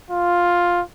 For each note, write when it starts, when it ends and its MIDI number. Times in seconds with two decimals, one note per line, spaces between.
0.10 0.81 65